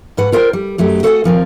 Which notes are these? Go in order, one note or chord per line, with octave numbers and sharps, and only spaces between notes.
G#2 B4 F#5
F4 A#4 C5 F#5 G5
G3
F#2 F#3 A3 G4
F#4 A4 C#5 F5 F#5 G#5
D#2 F3 C4 A#4